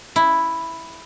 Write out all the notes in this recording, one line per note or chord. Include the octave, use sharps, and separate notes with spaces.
E4